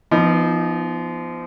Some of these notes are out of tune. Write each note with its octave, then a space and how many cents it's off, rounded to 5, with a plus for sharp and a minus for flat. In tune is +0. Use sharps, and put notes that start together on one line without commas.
F3 -30 B3 +0 D#4 +0